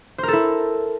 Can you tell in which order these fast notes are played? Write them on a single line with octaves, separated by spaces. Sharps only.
C5 A#4 A4 E4